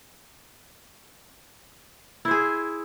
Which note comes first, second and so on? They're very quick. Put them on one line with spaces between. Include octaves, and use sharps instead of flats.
E4 C5 G#4